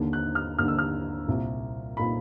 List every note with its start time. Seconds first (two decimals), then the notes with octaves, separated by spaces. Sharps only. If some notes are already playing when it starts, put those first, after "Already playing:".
Already playing: D#2 D3
0.13 F#6
0.35 F6
0.59 D#2 D3 F6
0.68 E6
0.78 F6
1.28 C2 A#2
1.97 A#2 B5